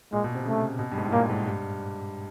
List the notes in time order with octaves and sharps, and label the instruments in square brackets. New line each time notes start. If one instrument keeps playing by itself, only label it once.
[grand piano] A#2 [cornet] G#3
[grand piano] B2
C3
[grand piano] C#3 [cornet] A3
[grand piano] B2
G2
G#2
A2
[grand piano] A#2 [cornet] A#3
[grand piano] G#2
G2